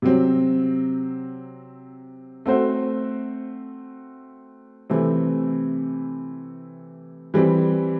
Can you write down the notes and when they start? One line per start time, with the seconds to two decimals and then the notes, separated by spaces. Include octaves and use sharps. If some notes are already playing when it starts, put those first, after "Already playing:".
0.02 C3 F#3 C4
2.46 A3 C4 F#4 C5
4.90 C3 E3 A3 C4
7.34 E3 G3 C4